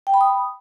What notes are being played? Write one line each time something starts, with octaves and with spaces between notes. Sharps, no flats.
G5
B5
D#6